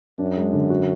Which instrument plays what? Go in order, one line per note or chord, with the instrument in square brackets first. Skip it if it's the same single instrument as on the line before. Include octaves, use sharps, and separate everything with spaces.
[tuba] F#2 [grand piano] D4
[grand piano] G#3
D3
F#4